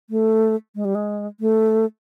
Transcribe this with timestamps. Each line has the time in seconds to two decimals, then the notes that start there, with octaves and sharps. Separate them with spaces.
0.10 A3
0.75 G#3
0.85 G3
0.95 G#3
1.40 A3